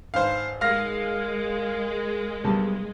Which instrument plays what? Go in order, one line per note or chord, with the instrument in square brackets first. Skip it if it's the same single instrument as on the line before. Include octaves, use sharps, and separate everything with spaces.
[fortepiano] G#1 B4 [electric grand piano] C5 F5
[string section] G#3 [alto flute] A#4 [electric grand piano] F5 F6 A#6
[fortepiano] B1 G3 A5